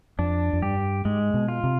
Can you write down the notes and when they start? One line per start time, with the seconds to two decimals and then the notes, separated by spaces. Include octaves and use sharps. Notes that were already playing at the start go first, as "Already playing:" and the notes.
0.19 F2 D4
0.53 F2
0.62 G2 G4
1.05 G#2 G#3
1.34 B2
1.48 F4
1.64 C3